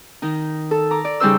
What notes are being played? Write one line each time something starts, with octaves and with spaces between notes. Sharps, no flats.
D#3 D#4
A4
A#5 D6
D5
C#3 G3 D#4 C5 E6